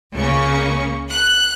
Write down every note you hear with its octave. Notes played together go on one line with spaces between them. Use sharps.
C#2 C#3 A#3 C#4 C#6
F#6